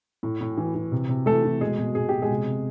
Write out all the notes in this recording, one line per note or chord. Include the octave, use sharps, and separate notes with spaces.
A2
A2
E3
E3
C3
C3
E3 A3 A4
E3
B2 G#3 G#4
B2
B2 G#4
B2 G4
G#3 G#4
C3
C3